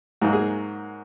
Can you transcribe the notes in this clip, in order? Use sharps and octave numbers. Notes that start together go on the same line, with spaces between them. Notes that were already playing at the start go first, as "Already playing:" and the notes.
G#2 F#3 A#3 D#4 F#4
G#4